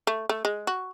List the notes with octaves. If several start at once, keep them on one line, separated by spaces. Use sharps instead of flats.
A3
A3
G#3
F#4